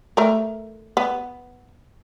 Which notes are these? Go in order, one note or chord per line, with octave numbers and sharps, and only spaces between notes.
A3 A#4
B3